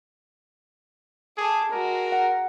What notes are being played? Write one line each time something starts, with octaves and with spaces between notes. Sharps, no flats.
G#4 A4 D6
G#3 F#4 A#4
F#5